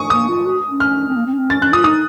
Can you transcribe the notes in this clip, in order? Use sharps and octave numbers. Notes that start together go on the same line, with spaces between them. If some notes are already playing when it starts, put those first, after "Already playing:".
Already playing: C#6 D#6
A#3 D#6
F4
F#4
C#4
F6
C4
A#3
C4
C#4
C4
C#4 A6
C#4 F#6
F4 D#6
D#4 D#6